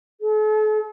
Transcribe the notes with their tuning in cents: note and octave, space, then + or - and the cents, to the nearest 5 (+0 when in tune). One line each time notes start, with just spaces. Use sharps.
A4 -45